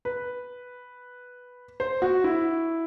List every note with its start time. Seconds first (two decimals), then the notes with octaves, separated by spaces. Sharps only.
0.05 B4
1.80 C5
2.02 F#4
2.24 E4